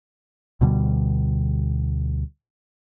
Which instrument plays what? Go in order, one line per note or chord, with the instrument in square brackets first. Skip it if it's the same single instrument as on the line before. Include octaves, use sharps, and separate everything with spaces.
[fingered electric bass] D2 B2 D3 G3